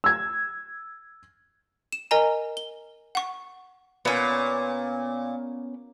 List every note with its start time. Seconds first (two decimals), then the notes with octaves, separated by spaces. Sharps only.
0.04 E6 G#6
1.92 E7
2.11 A#4 D#5 G#5 A#5
2.57 G7
3.15 F#5 C#6
4.05 A#2 B3 C#4